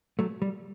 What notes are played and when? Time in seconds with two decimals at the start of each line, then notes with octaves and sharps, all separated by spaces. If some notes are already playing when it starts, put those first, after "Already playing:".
0.19 F#3 A3
0.42 G3